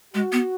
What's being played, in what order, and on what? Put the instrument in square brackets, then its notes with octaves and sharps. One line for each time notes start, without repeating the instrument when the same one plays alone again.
[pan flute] G#3 [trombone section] F#4
[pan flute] B3